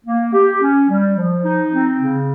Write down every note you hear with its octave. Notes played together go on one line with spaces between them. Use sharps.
A#3
G4
C#4
G3
F3
D#4
C4
C#3